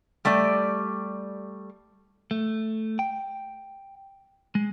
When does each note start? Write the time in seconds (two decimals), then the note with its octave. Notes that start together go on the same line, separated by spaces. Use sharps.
0.25 G3 A3 G4 D5
2.31 A3
2.99 G5
4.55 G#3